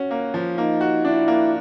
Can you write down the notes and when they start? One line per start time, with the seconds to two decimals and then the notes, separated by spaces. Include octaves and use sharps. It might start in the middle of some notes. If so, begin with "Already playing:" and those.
Already playing: C#4 F#4
0.11 A#3
0.34 F3
0.58 A#3 D#4
0.81 F#4
1.05 D4 E4
1.28 A#3